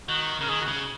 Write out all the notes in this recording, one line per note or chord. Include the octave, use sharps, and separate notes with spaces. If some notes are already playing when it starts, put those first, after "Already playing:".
D#3 F#4
C#3 A#4
D#3 G#4
F#4
C#3